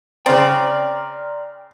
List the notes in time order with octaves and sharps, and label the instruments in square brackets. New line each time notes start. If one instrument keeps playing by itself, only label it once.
[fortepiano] C#3 C4 [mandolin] D5 [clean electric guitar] G5 [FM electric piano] A#5 C6 F6